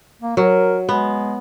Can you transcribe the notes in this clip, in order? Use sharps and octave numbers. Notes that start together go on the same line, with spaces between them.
A#3
F#3 A#4
G#3 B3